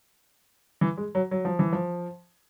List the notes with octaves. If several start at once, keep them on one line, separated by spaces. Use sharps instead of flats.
E3
G#3
F#3
F#3
F3
E3
F3